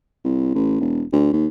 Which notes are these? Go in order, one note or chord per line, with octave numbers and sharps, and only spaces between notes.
C2
A1
E1
D2
D#2